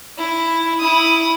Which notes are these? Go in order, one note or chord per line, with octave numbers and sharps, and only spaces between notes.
E4
E4 D#6